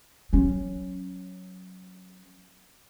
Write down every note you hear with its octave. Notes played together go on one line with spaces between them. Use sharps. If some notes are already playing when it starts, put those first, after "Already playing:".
F#3 C#4